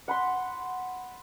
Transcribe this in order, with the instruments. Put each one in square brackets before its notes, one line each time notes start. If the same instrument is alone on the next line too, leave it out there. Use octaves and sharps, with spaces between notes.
[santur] F#5 B5 C6